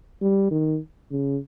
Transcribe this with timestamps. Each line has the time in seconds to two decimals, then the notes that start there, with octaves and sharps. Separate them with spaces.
0.21 G3
0.51 D#3
1.11 C#3